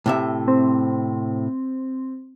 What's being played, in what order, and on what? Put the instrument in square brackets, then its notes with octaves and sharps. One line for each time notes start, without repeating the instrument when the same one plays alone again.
[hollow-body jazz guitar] A2 C3 E5
[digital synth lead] C4